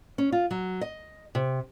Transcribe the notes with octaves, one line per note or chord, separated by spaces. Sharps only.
C#4
F4
F#3
D#5
C3